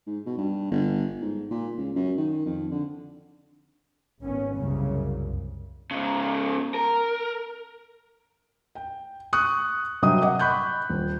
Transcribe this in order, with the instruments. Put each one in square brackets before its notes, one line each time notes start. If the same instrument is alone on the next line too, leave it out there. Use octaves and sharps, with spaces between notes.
[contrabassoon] G#2
B2
G2
G1
G#2
A#2
C#2
F#2
D#3
F2
D3
[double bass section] G#1 B3 C#4
C2 F#2 C#3 A#3
[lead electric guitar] G#2 C#3
A#4
[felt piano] G5
C#6 D#6 F#6
G2 C3 F#3 D#5 G5 D#6
D#5 F#5 D6
B5 C#6 F#6 G6
D#1